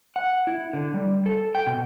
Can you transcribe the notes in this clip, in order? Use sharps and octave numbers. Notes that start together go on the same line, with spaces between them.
F#5
E4
D3
G3
A4
G5
B2